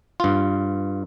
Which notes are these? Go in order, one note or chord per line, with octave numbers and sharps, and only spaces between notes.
G2 F4